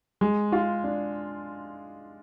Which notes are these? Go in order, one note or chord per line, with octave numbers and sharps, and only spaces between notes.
G#3
F4
D4